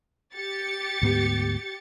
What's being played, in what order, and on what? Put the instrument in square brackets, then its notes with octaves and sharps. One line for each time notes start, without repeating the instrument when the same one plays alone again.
[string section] G4 A6 C#7
[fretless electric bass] D2 G#2 B3